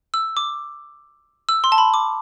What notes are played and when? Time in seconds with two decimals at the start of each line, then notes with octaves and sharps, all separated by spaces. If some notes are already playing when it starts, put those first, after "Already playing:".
0.14 E6
0.37 D6
1.49 E6
1.64 C6
1.72 A5
1.78 B5
1.94 D6